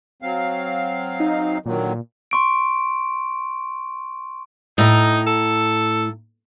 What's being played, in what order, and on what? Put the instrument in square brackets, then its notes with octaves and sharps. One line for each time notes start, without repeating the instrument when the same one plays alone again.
[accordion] F#3 C4 F5
[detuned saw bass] D#4
[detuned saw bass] A#2 [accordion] D3 D#3 F#3
[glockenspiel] C6 C#6 D7
[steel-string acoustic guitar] A2 A#5 [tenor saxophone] D#4
[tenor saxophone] A4